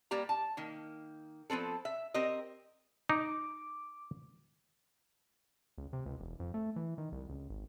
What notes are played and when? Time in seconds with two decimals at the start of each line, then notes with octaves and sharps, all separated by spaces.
0.11 G3 A#3 G4 A#5
0.29 A5
0.57 D#3 A#3
1.50 F3 B3 C4 A4
1.85 E5
2.14 C4 G4 A#4 D#5
3.09 D#4 D6
5.78 C#2
5.93 C3
6.06 C#2
6.20 E1
6.40 F2
6.54 A3
6.76 E3
6.98 D#3
7.12 C2
7.29 C#2
7.49 G#1